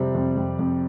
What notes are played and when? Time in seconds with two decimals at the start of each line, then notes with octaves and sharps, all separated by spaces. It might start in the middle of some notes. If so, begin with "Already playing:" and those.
Already playing: F2 C3 G3 C4
0.15 F2
0.37 F2
0.59 F2